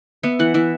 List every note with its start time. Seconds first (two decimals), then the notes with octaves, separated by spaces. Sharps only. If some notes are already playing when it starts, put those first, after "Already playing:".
0.23 B3 E5
0.39 E3 F#5
0.54 E3 E5